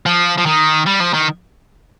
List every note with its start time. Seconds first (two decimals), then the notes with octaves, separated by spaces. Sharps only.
0.06 F3
0.38 F3
0.46 D#3
0.86 G3
1.00 F3
1.13 D#3